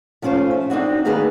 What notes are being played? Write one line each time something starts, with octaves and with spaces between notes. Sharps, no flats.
F3 A3 C#4 F4 C5
E5
C4 D4 D#4 F#4
D#3 A#3 B3 G#4 B4